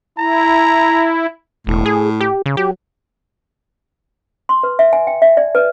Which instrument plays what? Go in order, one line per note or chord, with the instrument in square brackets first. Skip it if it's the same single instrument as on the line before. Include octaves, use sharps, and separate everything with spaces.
[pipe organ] E4 [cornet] A#5
[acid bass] E1 [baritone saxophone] A2
[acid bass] G#4
G4
C#3
[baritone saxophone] F#3 [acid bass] G4
[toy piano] C6
B4
E5
G#5
G5
E5
D5
B4